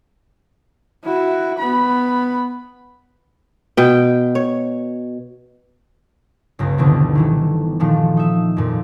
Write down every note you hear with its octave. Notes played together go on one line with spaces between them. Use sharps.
E4 F#4
B3 B5
B2 G5
C#5
G1 C#2 A#6
D2 B2 D#3 E3 C4
D#3 E3 A3
A#2 D#3 F3 G#3 A3
D#4 E5
F2 A#2